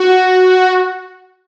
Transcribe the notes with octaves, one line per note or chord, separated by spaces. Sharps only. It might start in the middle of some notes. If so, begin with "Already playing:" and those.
Already playing: F#4